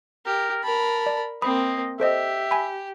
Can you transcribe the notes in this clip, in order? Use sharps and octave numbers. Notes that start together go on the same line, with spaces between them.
G4 A#4
A#4 A5 B5
D5
A#3 C4 D#5 B5 D#6
G4 A4 C5 D#5 E5
G#5 B5